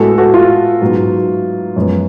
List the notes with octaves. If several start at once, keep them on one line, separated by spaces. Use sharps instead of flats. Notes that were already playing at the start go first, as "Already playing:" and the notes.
Already playing: A2 G#3 B3 F#4 A4
F#4 A4
F4
G#2 F#3 B3
F#2 F3 G#3 B3